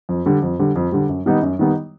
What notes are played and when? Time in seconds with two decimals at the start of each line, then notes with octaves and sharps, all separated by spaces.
0.09 F2
0.26 D3 G3
0.42 F2
0.59 D3 G3
0.76 F2
0.92 D3 G3
1.09 F#2
1.26 D#3 G3 B3 D#4
1.42 F#2
1.59 D#3 G3 B3 D#4